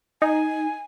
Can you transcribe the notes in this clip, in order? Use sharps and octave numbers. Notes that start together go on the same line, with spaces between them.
D#4 G#5